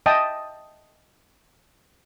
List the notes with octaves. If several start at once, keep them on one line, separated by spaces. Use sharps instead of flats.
D#5 E5 G5 A5 D#6